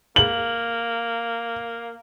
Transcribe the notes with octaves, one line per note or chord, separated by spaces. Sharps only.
A#3 F#7